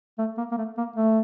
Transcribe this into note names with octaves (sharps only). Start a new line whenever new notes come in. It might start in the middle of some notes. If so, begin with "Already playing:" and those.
A3
A#3
A#3
A3
A#3
A3